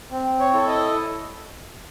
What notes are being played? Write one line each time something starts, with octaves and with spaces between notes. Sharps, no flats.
C4
C#5
E4 A4
D#5